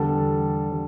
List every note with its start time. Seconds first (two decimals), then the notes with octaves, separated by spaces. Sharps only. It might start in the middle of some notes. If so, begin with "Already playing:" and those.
Already playing: E2 D3 G3 D4 A4
0.71 D3 G3